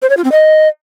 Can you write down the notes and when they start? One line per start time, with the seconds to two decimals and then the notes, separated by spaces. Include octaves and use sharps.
0.02 C5
0.10 C#5
0.17 F4
0.24 C4
0.32 D#5